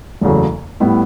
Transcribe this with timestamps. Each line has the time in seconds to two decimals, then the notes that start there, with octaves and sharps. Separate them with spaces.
0.21 F#1 E2 C#3 F#3 A3
0.80 A2 G3 B3 E4